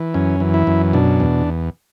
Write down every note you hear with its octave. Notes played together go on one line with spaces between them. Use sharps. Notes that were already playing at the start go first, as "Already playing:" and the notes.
Already playing: E3
F#2 C#4
E3
E4
F#2
B2 D4
E2